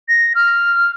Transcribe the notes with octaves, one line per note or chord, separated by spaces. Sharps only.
A#6
F6